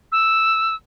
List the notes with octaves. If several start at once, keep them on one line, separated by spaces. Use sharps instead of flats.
E6